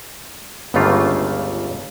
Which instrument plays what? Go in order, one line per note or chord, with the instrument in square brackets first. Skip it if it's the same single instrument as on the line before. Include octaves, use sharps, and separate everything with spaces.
[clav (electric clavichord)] G1 C#2 C#3 A3 A#3 F4